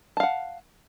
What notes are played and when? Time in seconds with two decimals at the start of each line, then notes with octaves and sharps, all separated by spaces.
0.17 A5
0.20 F5
0.23 F#5